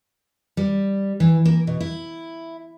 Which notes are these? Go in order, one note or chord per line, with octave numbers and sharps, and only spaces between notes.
G3
E3
A#3
B2
E4